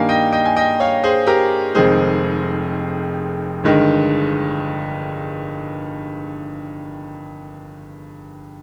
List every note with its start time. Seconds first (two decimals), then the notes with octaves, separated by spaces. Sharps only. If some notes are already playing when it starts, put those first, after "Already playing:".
Already playing: G2 D#3 G3 A#3 F5 G#5
0.09 D#5 G5
0.33 D#5 G5
0.45 G#5
0.57 D#5 G5
0.80 C#5 F5
1.04 G#4 C5
1.27 G4 A#4
1.75 F1 F2 D#3 G#3 G#4 C5
3.64 G1 G2 D#3 G#3